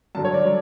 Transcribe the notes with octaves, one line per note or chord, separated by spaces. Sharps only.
F#2 D3 F#3 A5
C#5
D5
D3 F#3